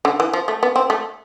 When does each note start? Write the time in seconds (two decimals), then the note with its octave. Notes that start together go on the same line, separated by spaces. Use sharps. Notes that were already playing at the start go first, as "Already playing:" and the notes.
0.05 D3
0.20 E3
0.33 F3
0.48 A3
0.63 B3
0.76 C4
0.90 A3